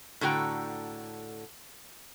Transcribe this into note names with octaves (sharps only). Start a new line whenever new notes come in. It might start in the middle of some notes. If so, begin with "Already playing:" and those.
A2 D3 F#4 G5 A#5